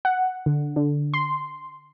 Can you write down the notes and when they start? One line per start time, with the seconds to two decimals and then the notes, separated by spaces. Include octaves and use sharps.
0.05 F#5
0.46 D3
0.76 D3
1.14 C6